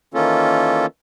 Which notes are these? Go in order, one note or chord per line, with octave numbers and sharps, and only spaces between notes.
D#3 E3 A#3 C#4 F4 A4